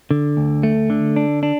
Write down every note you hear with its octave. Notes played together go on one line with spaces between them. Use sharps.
D3
D2
A3
D3
D4
D4